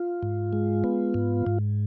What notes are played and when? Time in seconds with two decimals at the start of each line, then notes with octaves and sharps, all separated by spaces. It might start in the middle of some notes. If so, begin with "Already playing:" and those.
Already playing: F4
0.23 G#2
0.53 G#3
0.84 B3
1.14 G#2
1.46 G#2